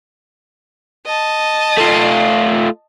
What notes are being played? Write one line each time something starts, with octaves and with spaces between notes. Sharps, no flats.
D#5 A5
A3 F4